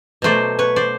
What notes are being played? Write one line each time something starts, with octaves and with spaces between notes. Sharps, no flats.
B2 F#3 A3 C5 D5
B4 C#5
C5 D5